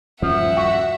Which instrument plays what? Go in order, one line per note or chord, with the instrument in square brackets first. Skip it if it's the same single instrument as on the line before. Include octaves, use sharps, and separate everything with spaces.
[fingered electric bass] D#1 G2 C#4 [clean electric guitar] F3 [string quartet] E5 F#5
[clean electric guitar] F#4